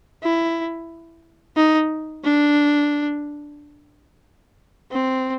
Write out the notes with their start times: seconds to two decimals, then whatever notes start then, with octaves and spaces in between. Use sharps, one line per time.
0.23 E4
1.56 D#4
2.24 D4
4.91 C4